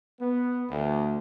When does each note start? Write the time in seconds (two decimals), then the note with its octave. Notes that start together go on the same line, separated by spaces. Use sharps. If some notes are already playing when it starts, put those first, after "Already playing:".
0.19 B3
0.70 D2